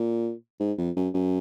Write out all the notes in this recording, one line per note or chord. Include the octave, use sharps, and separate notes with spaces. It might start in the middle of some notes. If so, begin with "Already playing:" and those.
Already playing: A#2
G#2
F2
F#2
F#2